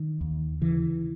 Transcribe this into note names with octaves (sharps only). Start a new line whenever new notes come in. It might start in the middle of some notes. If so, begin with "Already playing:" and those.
Already playing: D#3
D#2
C#3 E3